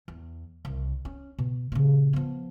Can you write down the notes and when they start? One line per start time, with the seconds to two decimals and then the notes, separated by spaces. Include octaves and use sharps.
0.08 E2
0.65 C2
1.05 C#4
1.39 B2
1.72 A#2 C#3
2.13 F3 B3